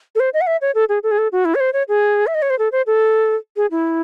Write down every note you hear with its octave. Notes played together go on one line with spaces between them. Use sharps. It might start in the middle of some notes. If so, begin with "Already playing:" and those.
A4
C5
D#5
F#5
E5
C#5
A4
G#4
A4
G#4
A4
F#4
E4
C#5
C5
C#5
G#4
E5
D#5
C#5
C5
A4
C5
A4
G#4
E4